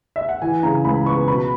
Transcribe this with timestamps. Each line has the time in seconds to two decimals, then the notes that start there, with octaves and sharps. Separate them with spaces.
0.16 E5
0.29 F#5
0.42 E3 G#5
0.63 C#3 A#5
0.85 C#2 B5
1.06 B3 C#6
1.28 B2 B5